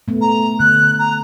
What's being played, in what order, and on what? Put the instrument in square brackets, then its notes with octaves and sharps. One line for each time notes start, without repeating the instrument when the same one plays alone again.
[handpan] A3 B3
[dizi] A#5
[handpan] D3 [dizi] F#6
[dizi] A#5